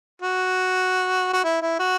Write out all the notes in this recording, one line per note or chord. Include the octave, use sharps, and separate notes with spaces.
F#4
F#4
E4
E4
F#4